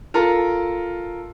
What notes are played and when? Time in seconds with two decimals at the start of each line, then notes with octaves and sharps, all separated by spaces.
0.14 F4 A4 A#4